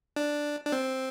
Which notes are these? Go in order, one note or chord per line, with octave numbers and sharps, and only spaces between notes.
D4
D4
C4